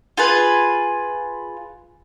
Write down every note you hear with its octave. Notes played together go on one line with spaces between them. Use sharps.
F4 G#4 B4